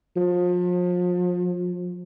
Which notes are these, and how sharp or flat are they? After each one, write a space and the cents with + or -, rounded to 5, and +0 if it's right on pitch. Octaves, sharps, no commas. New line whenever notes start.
F3 +35